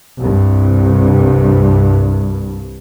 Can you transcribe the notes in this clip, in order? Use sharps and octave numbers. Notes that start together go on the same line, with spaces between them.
C2 G2